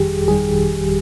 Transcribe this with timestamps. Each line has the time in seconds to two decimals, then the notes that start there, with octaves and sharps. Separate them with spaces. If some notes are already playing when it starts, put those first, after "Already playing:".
Already playing: G1 F2 D#3 G3 G4 G#4
0.27 G1 F2 D#3 G3 G#4